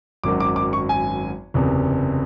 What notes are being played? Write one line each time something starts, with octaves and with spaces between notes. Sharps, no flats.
G#1 F#2 D#3 F#3 D6
D6
D6
C#6
G#5
F#1 E2 C3